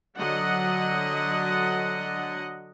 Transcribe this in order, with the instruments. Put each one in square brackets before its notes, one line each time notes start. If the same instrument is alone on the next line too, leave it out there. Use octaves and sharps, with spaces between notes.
[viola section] D3 F#3 D#5 F#5